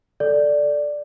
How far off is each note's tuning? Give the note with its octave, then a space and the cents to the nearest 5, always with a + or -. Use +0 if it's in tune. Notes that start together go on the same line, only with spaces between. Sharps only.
A4 +5 D5 +0